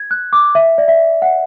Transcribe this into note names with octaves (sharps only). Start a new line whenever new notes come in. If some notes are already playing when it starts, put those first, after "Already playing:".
Already playing: G#6
F#6
D6
E5
D5
E5
F#5